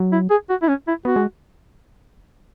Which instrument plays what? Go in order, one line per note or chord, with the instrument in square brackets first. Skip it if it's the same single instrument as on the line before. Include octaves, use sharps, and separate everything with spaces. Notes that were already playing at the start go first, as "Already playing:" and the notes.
Already playing: [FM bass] F#3
[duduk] E4
G#4
F#4
E4
C#4
E4
[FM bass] B3 [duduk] F#4
[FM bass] G#3